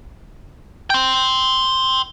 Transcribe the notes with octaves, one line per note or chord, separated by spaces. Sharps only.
G5 C6